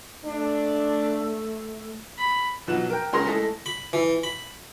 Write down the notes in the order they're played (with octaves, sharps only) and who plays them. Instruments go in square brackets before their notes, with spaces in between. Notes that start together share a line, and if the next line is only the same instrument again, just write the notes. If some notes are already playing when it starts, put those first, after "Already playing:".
[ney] A3 [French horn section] D4
[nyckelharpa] B5
[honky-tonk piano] B1 F3 F#3 B3 F#6 E7
A#4 G5
C#2 C#4 G#4 A#4 C6 A#6
G#3 A3 E4 A4 D#5 A5
[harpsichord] B5
E3
B5